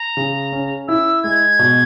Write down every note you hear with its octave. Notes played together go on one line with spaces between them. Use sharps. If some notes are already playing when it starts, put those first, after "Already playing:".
Already playing: A#5
C#3
C#4
E4 E6
G#3 G#6
B2